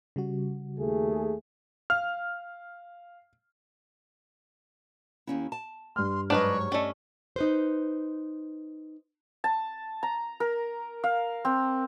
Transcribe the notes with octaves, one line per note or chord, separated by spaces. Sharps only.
C#3 G3 F#4
D#2 A3 G#4
F5 F6
D#2 C#4 E4
A5
G2 C6 F6
G#2 F#3 D4 B4 C#5 D#5
A3 C#4 D5 D#5
D#4 B4 C5
A5
A#5
A#4
F5
C4